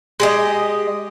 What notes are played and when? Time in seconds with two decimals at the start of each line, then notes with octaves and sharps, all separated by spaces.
0.20 G#3 G4 D#5